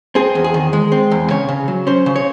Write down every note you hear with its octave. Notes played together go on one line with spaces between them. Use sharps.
C4 G#4
E2
G#4
D#3
G#3
C4
E2
C#3 C#5
C#3
F#3
C#4 C5
C#3
C#5